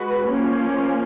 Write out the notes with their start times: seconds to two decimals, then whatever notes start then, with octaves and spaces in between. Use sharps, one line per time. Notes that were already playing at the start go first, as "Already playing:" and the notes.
Already playing: G#3 F#4 B4
0.28 F3 A#3 C#4